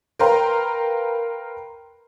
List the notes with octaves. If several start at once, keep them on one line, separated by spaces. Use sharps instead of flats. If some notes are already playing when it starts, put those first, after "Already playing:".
A#4 B4 F5 G5 A#5 C6